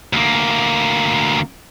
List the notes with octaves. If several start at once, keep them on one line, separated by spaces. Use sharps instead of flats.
D2 A#3